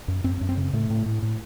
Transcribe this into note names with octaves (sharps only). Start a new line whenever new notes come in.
F#2
F#2 C4
F#2
C4
C#3
A2 A3
A2
A2
A2